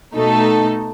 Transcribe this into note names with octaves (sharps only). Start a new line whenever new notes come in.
B2 A3 D#4 A4